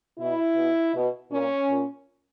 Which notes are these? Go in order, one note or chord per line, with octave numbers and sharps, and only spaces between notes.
B2 E4
B2
B2
A#2 C#4
A#2